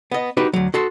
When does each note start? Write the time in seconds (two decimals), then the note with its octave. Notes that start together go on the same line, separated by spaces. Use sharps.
0.12 B3 D#5
0.37 D#4 F#4 G4 B4
0.53 D2 F#3
0.74 F#4 A4 C6